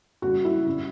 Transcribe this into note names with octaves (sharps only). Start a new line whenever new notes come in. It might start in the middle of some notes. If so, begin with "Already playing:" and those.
C#3 G3 F#4
E4
C#3 G3